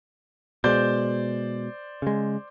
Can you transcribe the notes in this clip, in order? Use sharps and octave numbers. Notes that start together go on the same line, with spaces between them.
B2 G#3 C5 D5 G6
C#3 G#3